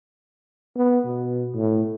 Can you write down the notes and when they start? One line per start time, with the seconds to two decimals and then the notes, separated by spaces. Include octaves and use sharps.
0.77 B3
1.05 B2
1.55 A2